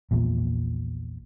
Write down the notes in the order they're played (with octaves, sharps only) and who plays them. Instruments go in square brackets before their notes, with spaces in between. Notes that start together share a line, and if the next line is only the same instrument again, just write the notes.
[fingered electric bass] A#1 E2 A#2